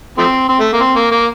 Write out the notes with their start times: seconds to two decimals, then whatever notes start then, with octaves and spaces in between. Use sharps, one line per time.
0.18 F3 A3 C4
0.49 C4
0.60 A3
0.73 A#3
0.80 C4
0.96 A#3
1.11 A#3